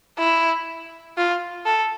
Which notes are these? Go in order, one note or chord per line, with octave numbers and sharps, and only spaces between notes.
E4
F4
A4